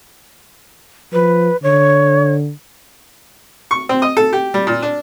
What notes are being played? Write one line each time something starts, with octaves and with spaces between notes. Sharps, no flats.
F3 B4
D3 C#5
C#6
C4
D#5
A4
G4
G3
A#2
D4